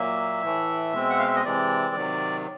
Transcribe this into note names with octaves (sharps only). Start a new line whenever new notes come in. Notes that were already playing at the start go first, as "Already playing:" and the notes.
Already playing: A#2 F#3 A#3 E5
A2 E3 A3
B2 G#3 C4
F#5
F5
E5
D#5
C3 E3 G#3 C4 D5
C3 D#3 F#3